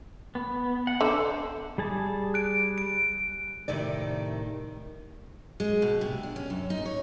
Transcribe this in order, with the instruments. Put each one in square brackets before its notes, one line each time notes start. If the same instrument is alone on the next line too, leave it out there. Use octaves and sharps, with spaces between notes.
[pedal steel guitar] B3
F#5
[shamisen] D3 [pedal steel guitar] C5
[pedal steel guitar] G3 G#4 A5
[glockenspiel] F#6 D7
D7
[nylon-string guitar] A2 C3 D#3 D5
[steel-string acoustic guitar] G#3
B2
C3
D4
C#4
F#2
D#4
C#5